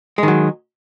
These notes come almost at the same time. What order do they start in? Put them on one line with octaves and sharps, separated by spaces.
G#3 D#3 F#3